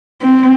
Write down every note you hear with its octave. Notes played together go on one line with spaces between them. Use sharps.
C4